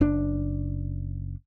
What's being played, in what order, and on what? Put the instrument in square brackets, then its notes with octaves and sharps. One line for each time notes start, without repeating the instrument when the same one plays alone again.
[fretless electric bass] F#1 D4